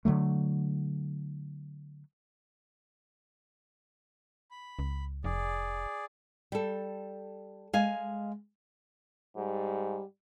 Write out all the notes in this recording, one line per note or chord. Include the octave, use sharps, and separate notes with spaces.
D3 F3 F#3 A3
B5
C#2
F1 G#4 D5
G3 A4
G#3 F5 G#5
G#2 G3